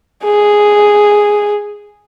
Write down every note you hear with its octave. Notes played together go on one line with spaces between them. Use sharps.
G#4